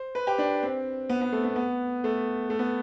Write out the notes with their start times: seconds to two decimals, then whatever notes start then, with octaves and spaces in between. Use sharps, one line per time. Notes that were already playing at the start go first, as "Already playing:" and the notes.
Already playing: C5
0.15 B4
0.27 G4
0.38 D4
0.63 C4
1.09 B3
1.21 B3
1.32 A3
1.44 B3
1.56 B3
2.04 A3
2.50 A3
2.59 B3